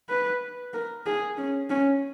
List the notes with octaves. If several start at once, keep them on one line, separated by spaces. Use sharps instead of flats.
B4
A#4
G#4
C#4
C#4